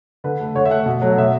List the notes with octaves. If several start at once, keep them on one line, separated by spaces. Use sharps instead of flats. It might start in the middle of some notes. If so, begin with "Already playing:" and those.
D3 B4
A3
D3 C#5
E5
A3 F#5
B2
F#3 A3
B2 E5